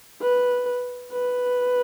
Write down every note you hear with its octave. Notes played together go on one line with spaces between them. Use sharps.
B4
B4